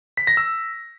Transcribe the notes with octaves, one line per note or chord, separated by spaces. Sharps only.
B6
A#6
E6